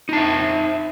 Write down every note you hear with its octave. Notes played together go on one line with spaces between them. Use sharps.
D#4 E5 A5